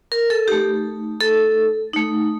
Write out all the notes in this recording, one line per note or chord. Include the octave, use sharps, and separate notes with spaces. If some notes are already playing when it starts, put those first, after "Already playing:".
A#4
A4
A3 D#4 G4
A4
A3 D#4